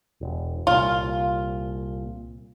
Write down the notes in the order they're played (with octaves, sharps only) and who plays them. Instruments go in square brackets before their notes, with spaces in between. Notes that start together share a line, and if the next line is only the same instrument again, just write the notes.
[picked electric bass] E1
[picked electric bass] C2 A#2 [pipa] F4